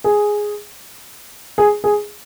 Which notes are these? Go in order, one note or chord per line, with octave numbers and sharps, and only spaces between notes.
G#4
G#4
G#4